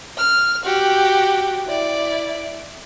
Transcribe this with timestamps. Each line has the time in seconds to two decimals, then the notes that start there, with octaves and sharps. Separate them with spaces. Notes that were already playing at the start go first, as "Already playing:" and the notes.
0.17 F6
0.65 F#4 G4
1.67 E4 D5